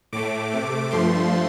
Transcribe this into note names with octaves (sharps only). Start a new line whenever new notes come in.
A2 A3 D6
C3 A3
G2 F3 A3 C6